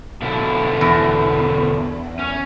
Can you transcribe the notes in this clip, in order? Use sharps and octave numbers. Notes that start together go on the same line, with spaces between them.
B2 D3 E4
E2
C#4